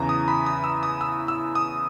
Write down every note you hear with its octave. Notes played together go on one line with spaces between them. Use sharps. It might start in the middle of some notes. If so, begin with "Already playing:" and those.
Already playing: E2 C#3 E3 A#5
D#6
B5
D#6
E6
D#6
E6
E6
D#6